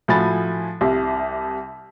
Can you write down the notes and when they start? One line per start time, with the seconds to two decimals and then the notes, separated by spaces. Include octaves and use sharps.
0.08 A2 F3 F#4 G#5 B5 A6
0.81 C2 C3